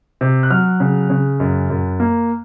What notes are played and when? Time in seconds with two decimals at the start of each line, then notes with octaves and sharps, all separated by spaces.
0.21 C3
0.43 F#6
0.50 F#3 F6
0.80 C#3
1.10 C#3
1.40 F#2
1.70 F#2
2.00 A#3